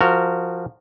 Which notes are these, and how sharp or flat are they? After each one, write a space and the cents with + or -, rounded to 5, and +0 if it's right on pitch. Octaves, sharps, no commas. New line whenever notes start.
F3 +0 F#4 +0 A#4 -20